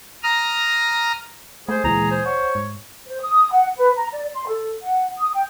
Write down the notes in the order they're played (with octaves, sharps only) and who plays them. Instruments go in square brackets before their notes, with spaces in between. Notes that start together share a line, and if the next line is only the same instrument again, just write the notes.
[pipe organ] A#5 D#6 F6
[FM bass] A3 [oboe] G#4 [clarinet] C5
[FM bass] D2 [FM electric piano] A#2 E3 G#3 [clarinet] A#5
[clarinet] C5
[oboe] C#5 [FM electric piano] F#5
[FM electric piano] G#2
[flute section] C5
D#6
F#5
B4
A#5
D5
C6
A4
F#5
D#6
G5